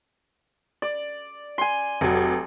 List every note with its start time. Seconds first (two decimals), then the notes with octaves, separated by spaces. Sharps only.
0.82 D5
1.58 G#5 C6
2.01 F1 F#3